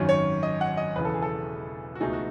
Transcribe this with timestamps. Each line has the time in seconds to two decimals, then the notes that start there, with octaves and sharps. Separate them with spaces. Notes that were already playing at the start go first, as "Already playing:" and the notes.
Already playing: G#1 F#2 D#3 F#3 C#4
0.09 C#5
0.43 D#5
0.61 F#5
0.77 D#5
0.96 E1 E2 C#3 E3 B4
1.05 A4
1.14 G#4
1.22 A4
1.95 F#4
2.00 C#2 B2 A3 D#4 G#4
2.13 F#4